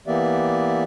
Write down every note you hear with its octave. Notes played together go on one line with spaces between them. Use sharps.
E3 A#3 B3 G4 D5 E5